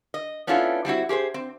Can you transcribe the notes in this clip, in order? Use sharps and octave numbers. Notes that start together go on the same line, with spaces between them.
D#5
B3 C#4 D4 E4 F4 A4
G3 C4 E4 F#4
G4 G#4 B4 C5
C4